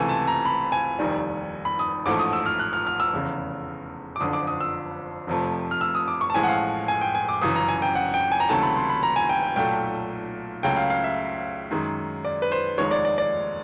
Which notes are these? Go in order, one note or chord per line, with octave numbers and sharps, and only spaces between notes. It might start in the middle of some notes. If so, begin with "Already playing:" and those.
Already playing: C#2 C3 E3 A3 G#5
A5
A#5
B5
G#5
F1 D#2 D#3 G3
B5
D#6
A1 G#2 F3 A3 D6
D#6
E6
F6
F#6
F6
F6
E6
F1 E2 C#3
D6
F#1 F2 D3 D#6
D6
D#6
E6
F1 F2 C3 F3 A3
F6
E6
D#6
D6
C#6
A5
A1 A2 F3 G#3 G#5
F#5
F5
G#5
G5
G#5
D6
G1 F#2 C#3 E3 D#6
A#5
G#5
G5
F#5
G5
G#5
A#5
C#2 C3 D#3 F#3 A3 A5
B5
C6
B5
A#5
G#5
G5
G5
B1 A#2 F#3 A3 G5
C#2 C#3 F#3 A3 G5
F5
F5
E5
F#2 D#3 G#3
D5
B4
C5
F1 D#2 D#3 G#3 C#5
D5
D5
D5